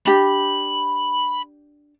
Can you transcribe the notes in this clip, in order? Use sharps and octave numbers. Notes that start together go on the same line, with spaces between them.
D4 G4 B5